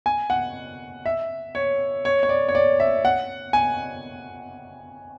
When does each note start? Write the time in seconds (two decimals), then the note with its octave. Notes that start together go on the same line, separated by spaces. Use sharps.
0.06 G#5
0.30 F#5
1.06 E5
1.55 C#5
2.05 C#5
2.23 C#5
2.29 D5
2.48 C#5
2.55 D5
2.80 E5
3.05 F#5
3.53 G#5